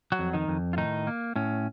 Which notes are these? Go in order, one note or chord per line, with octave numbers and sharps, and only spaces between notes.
F#3 F#4
F2
D#3 D#4
F2
F4
A2 D#3 D#4
A#3
A2 C#4